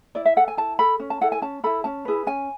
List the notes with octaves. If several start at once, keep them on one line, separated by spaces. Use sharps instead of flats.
E4 D5
E5
A4 F#5
G#5
E4 A5
A4 B5
C#4
A5
E4 A4 F#5
G#5
C#4 A5
E4 A4 B5
C#4 A5
E4 G#4 B4
C#4 G#5